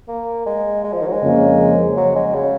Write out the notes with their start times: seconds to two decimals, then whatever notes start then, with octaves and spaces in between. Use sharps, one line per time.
0.08 A#3
0.47 G#3
0.84 G#3
0.93 F3
1.02 D#3
1.07 F#3
1.12 G#3
1.22 F2 C#3 F3 A#3 C#4
1.97 F#3
2.15 G#3
2.35 C#3